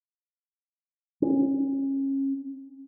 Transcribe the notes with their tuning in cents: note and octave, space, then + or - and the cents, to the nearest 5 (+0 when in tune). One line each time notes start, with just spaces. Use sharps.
C#4 -25